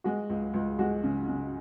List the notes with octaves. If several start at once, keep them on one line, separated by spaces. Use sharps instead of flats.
G#3 F#4
C#2
C#2
G#3 F#4
C#3
C#3